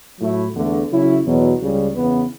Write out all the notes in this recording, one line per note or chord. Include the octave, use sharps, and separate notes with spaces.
A2 F#3 A3 E4
E2 D3 A3
C#3 F#3 C#4 E4
E2 B2 F#3
C#2 C#3 G3
E2 C#3 E3 B3